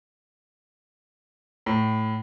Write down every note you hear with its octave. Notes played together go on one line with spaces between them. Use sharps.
A2